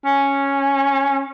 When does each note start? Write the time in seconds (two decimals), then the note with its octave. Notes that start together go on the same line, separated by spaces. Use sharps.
0.05 C#4